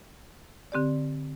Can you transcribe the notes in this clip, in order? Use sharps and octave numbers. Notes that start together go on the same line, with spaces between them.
D3 C4 G4 D5